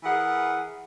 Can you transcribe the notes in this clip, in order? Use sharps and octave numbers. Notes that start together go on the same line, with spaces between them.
E3 G#4 A#4 F#5